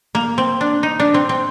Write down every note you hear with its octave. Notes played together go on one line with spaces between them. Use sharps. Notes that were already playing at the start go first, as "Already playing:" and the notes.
A#3
C4
D4
D#4
D4
C4
C4